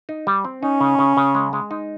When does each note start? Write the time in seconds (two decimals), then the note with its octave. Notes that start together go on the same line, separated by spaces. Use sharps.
0.09 D#4
0.27 G3
0.45 C4
0.63 C#4 D#4
0.81 C#3
0.99 C#3
1.17 C#3
1.35 G#3
1.53 G#3
1.71 D#4